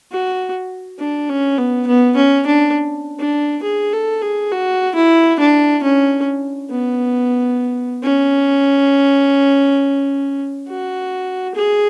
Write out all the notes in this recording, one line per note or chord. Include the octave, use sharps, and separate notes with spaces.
F#4
D4
C#4
B3
B3
C#4
D4
D4
G#4
A4
G#4
F#4
E4
D4
C#4
B3
C#4
F#4
G#4